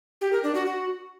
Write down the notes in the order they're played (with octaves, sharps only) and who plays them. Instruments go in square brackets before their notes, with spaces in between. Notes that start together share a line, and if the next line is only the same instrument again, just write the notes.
[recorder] G4
A#4
D4
F#4
F#4